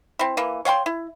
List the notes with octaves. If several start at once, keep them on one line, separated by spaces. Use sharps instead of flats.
C4 E4
E3 A#3
C#5 F5 G5 C6
E4